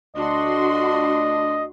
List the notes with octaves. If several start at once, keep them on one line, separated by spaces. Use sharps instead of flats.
D2 D4 F#4 D#5 C6